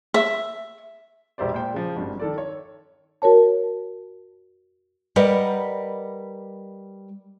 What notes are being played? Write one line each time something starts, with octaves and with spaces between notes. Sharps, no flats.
E5
E1 A#1 G4 C5 D5
A#2 C5 G5
C#3 F3
G#1 G2
D#3 A4 D5
C#5
F#4 A#4 C#5 A5
G3 A#4 B4 D#5 F#5